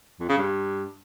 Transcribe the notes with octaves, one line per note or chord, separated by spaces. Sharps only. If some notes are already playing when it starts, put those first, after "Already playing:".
F2
C#3
G2